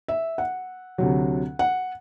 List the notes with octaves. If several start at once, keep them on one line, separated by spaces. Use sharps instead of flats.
E5
F#5
D2 C3 F#3
F#5